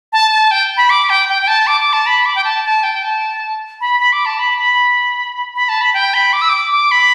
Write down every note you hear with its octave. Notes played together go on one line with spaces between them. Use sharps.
A5
A5
G5
B5
D6
G5
G5
G5
A5
D6
D6
A5
B5
D6
G5
A5
A5
G5
A5
B5
B5
D6
A5
B5
B5
B5
A5
B5
G5
B5
D6
E6
D6
D6
B5